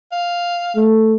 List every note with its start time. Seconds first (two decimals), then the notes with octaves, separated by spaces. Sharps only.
0.12 F5
0.76 A3